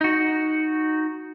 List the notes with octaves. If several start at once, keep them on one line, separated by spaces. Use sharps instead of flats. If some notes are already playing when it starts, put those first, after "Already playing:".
D#4 F#4